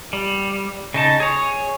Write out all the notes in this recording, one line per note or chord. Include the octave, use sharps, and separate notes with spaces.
G3
C#3 D#4 A5
G#4 C#5